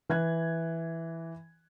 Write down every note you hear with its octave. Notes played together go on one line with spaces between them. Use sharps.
E3 F#6 G#6